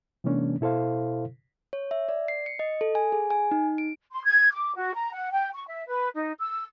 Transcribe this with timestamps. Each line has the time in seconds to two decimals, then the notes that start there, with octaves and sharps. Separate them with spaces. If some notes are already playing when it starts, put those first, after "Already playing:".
0.24 C3 E3 G#3 A#3 C#4 D4
0.61 B2 E4 A4 C5 F5
1.73 C#5
1.91 E5
2.09 D5
2.28 C7
2.46 C#7
2.59 D#5
2.81 A4
2.95 G#5
3.12 G#4
3.30 G#5
3.51 D#4
3.78 D7
4.12 C6
4.25 G#6
4.53 D6
4.76 F#4
4.94 A#5
5.13 F#5
5.32 G5
5.53 C#6
5.68 E5
5.88 B4
6.15 D#4
6.39 E6